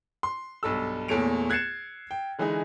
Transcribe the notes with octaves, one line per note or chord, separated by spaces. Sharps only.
C6
B1 G2 A4 E6
E2 A#2 A3 C#5 D7 F7
F#6 G#6 A6 C7 C#7 E7
G5
D3 E3 G#3 D#4 G#4